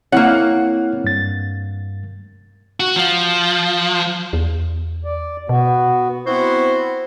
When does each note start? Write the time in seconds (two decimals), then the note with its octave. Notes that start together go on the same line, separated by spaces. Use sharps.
0.12 A#3 C4 E4 C#5 F#5
1.04 G2 A6
2.80 F#4
2.96 F3
4.33 E2
5.05 D5
5.49 B2 B3 F#4
6.26 B3 C4 E4 F#4 C5